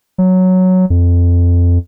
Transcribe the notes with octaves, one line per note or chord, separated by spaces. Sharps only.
F#3
F2